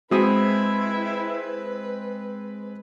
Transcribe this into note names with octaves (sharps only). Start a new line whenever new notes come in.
G#3 C4 E4 F#4 B4 D#6